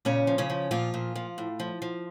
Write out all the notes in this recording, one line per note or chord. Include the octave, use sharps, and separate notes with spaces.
A#2 C#3 C#4
F3
C#3 C#4
F3
A#2 F3 F4
A#2
F3
A2
F3
F3